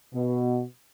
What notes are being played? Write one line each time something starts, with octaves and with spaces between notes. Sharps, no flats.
B2